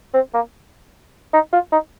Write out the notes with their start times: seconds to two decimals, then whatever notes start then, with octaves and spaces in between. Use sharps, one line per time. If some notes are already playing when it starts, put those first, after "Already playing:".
0.14 C4
0.34 A#3
1.34 D#4
1.53 F4
1.72 D#4